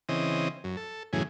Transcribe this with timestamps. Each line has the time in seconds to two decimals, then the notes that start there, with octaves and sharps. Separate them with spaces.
0.09 C#3 E3 C4 D#5
0.64 F#2
0.77 A4
1.13 F#2 A2 C#3 E3 G#4